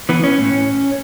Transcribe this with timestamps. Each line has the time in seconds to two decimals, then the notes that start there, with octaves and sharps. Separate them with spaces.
0.09 E3 B3
0.24 C#4
0.39 A2